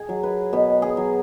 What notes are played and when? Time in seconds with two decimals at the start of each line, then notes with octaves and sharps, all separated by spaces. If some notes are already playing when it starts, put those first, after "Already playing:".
Already playing: G#4
0.09 F#3
0.23 B4
0.53 B2 B4
0.82 G#4
0.97 F#3